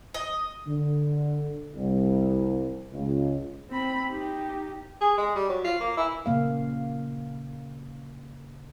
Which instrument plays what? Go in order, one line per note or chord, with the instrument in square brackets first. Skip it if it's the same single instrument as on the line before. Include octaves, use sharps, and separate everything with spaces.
[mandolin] D#5
[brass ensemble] D3
C2
C#2
[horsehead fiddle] C4 B5
D#4 G4
[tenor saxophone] G#4
G#3
G3
F#3
F4
A#3
E4
[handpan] A#2 C#3 A#3 F5